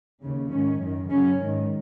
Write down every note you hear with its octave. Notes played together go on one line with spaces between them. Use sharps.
D#2 C#3
G#2 D#3 C#4
F#2 D#3
F#2 C#3 C#4
G#2 D#3